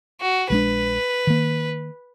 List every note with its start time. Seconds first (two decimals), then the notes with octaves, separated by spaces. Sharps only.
0.21 F#4
0.50 A#1 G#3 D4 B4
1.27 D#3 A#3